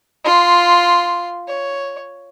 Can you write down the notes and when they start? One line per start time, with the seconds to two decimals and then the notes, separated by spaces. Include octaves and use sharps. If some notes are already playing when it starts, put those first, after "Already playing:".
0.25 F4 C6
1.48 C#5